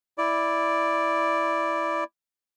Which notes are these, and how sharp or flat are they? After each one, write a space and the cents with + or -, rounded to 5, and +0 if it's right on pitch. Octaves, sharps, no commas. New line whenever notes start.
E4 +0 D5 +0